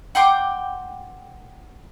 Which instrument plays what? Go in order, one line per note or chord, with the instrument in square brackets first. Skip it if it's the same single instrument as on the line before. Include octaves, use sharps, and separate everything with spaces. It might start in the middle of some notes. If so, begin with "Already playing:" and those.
[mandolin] F#5 G5 C6 D6